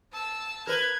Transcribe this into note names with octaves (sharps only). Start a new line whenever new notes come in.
A5 E6
A#4 B4 G#6